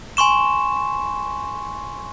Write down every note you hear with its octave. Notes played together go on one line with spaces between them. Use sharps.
G#5 C6 C#6 E7